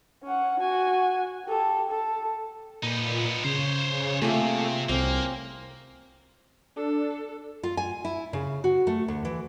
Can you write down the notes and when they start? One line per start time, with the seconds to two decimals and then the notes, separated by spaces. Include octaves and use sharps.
0.23 C#4 F#5
0.60 F#4 G#5
1.45 G4 A4
1.90 A4
2.83 A#2 B3 D#4
3.44 C#3 C5 C#5
4.22 C3 A3 A#3 F4 G#4
4.89 C2 A#3 C4 C#4
6.76 D4 A4
7.63 F4
7.77 G#5
8.05 E4
8.33 C#3
8.64 F#4
8.87 A3
9.08 D2
9.25 E3